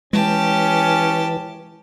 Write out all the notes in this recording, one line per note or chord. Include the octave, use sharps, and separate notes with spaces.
E3 G#3 C#4 G4 A5